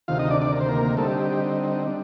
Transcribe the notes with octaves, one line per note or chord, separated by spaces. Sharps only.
D2 C3 D#3 F4 F5
D#4 D#5
D4 D5
D4 D5
A#4
C5
A#3 A#4
D3 G3 A3 C4 D#4 A4
G4
G4
G4
G3 D4